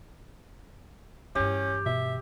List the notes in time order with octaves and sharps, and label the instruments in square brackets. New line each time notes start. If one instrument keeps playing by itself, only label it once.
[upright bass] G2 E3 [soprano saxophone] C#4 [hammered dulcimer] G4
[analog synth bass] B2 [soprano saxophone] E5